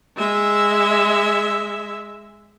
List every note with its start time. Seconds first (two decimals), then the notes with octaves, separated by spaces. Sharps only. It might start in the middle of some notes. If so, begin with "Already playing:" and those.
0.17 G#3 E5